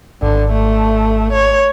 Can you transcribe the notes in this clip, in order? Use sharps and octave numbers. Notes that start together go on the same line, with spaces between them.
G#1 D3
A3
C#5